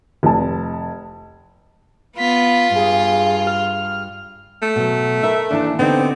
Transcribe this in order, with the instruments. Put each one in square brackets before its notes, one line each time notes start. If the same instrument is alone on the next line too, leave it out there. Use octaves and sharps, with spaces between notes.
[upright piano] F1 A5
[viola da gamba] B3 [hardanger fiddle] F4 [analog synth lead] B6
[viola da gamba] G2 [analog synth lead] G#4
[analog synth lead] F6
[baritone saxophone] A3
[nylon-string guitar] B2 F#3
[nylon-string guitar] D#4 A#4 [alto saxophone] E5
[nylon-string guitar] D#2 E3 A5 [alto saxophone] D4
[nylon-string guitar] D3 D#4 G4 [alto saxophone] B3 [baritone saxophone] C4